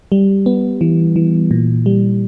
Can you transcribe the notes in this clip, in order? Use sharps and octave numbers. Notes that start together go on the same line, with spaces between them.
G3
B3
E3
E3
A#2
G3